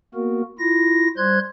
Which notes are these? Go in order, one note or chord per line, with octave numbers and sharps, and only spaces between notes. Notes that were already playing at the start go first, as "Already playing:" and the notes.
A#3 B3 F#4 A#4
E4 F4 A#6
G3 C5 C6 F#6 G#6